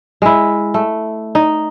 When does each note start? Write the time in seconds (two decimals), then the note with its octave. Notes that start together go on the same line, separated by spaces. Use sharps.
0.22 G#3 E4
0.74 A3
1.35 D#4